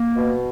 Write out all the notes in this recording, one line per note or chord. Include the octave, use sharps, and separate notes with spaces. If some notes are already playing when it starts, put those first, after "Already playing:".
Already playing: A#3
B2